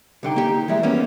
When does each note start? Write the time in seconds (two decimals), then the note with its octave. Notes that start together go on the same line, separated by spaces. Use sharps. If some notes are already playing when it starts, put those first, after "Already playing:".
0.23 C2 D3 D#4 G5
0.36 A#3 G4
0.68 E3 G3 G#3 E5
0.83 A#3 B3 C#4